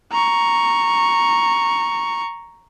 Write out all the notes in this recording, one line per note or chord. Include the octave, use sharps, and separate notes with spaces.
A#5 C#6